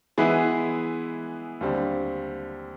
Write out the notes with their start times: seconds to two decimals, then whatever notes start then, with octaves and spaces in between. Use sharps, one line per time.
0.18 E3 G#3 B3 E4 G#4
1.61 D#2 D3 G3 C4